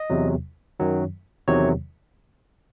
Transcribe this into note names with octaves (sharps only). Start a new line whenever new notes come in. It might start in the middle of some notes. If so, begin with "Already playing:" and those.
Already playing: D#5
E2 C3 F#3
F#2 D#3 F#3
E2 C3 D#3 F#3 C#5